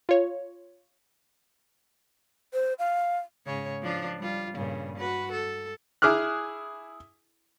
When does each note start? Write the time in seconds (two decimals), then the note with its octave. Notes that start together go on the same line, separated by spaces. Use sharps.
0.09 F4 C#5
2.54 C5
2.79 F5
3.47 G#2 C#3 C#5
3.82 F3 D4 F4
4.19 G3 F4
4.55 G2 A#2 C#3
4.98 F#4 B4
5.32 A4
6.02 E4 G#4 D6 F6 F#6